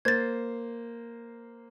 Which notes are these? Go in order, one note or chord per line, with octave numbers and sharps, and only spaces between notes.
A#3 C5 G#6 A6